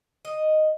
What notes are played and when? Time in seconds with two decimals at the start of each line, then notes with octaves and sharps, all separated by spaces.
0.25 D#5